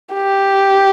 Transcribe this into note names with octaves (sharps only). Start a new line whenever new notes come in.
G4